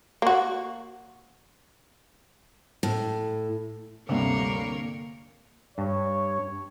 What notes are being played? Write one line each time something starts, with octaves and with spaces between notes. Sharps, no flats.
A#3 F#4
A2
D2 G2 C3 A#3 A#4 C#5
G2 C#5